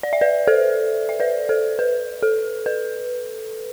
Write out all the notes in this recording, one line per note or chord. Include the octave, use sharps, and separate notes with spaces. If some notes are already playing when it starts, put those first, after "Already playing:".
D5
E5
B4 D5
A4 C5
E5
B4 D5
A4 C5
B4
A4
B4